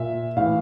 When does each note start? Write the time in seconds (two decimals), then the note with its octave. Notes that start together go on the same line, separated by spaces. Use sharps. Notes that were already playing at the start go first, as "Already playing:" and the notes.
Already playing: A#2 E5
0.37 A2 E3 F5